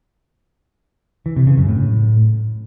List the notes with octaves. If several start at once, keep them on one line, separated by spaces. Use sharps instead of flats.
E3
C3
C#3
F#2
A2